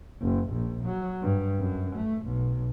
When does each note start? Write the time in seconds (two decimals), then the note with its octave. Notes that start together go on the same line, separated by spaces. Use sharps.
0.21 F#1
0.53 A#1
0.84 F#3
1.22 G2
1.59 F#2
1.96 A3
2.25 B1